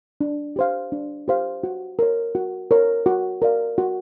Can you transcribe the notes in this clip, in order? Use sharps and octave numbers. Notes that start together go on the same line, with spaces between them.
D4
G4 C5 F5
D4
G4 C5 F5
F#4
A#4 C#5
F#4
A#4 C#5
F#4
A#4 D5 F5
F#4